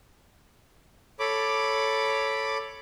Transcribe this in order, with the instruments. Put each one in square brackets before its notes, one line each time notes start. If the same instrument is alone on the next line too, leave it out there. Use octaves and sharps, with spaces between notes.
[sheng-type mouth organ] A4 C#5 B5 D6